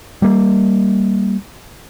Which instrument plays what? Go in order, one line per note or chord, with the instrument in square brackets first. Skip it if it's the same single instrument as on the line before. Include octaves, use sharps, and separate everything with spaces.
[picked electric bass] G3 A#3